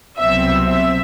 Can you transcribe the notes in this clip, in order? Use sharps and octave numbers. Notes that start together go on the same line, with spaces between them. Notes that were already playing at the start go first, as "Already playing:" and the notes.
C2 B2 F#3 C4 E5
E5